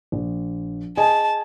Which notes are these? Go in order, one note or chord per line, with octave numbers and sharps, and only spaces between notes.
A#1
G#4 D#5 G#5 A5